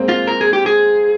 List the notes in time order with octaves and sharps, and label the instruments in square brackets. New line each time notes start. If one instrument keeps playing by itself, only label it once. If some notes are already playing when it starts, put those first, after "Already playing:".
Already playing: [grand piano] G#3 A#3 C4
[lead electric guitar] F4
A#4
G#4
G4
G#4